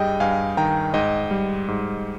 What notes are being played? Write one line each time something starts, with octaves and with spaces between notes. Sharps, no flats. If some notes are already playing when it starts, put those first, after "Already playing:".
Already playing: G2 G3 G#4 D#5 G5
G2 F5 G#5
D#3 G5 A#5
G#2 D#5 G5
G3
G#2